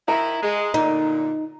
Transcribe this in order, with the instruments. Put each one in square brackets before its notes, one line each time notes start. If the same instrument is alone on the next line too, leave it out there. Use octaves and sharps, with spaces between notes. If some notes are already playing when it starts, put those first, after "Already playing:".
[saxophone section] D#3 E4 [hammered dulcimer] A#5
[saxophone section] G#3
[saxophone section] A#2 D3 [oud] D#4